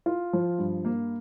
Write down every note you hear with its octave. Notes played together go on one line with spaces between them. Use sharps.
F4
F3
G2
A#3